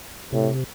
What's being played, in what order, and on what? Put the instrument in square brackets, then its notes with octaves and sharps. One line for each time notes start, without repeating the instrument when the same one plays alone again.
[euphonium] A2 [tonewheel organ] C3